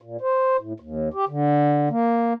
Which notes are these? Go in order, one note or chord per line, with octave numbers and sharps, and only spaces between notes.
A#2
C5
A2
D#2
G4
D3
A#3